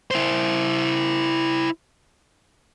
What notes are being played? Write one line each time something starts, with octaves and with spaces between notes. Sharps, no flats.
E4 C5